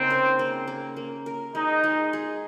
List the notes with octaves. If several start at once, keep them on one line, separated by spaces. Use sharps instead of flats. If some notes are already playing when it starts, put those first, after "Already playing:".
Already playing: C#3 A#3 C4 D#4
A#4
A#3
A#3
A#3
A#4
G#3 D#4
G#3
G#4